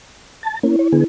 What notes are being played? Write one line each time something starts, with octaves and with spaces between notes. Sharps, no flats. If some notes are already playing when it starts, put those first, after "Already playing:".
A5
A#3 C#4 E4
C#5
D3 B3 G#4